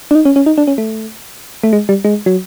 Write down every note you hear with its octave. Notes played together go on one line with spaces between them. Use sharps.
D4
D#4
C#4
C#4
D#4
D4
C#4
A3
A3
G#3
G3
G#3
F#3